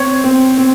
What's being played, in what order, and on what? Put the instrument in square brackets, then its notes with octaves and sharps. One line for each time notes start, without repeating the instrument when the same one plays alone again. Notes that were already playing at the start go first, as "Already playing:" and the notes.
Already playing: [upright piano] C4 C#5
C4
C4